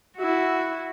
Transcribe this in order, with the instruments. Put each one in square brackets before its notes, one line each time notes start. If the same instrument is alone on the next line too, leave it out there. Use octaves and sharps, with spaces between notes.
[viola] E4 F#4